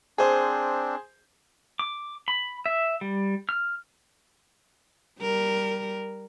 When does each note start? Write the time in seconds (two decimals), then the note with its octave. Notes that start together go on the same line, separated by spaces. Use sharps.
0.18 C4 D4 G#4 C5
1.79 D6
2.28 B5
2.66 E5
3.01 G3
3.49 F6
5.20 G3 A#4